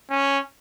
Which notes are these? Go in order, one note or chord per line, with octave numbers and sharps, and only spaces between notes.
C#4